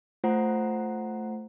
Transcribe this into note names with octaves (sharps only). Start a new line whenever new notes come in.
A3 F4 C5 F#5 A#5 C7